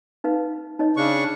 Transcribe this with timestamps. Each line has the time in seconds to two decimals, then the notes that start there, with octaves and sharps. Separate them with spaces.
0.24 D#4 B4 F5
0.79 D#4 C#5 D#5
0.97 C#3 D4 C#6